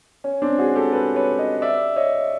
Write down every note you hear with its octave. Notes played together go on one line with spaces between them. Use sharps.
C#4
C4 D4
F#4 G#4
G4 A4
A4 B4
B4 C#5
C#5 D#5
D5 E5
C#5 D#5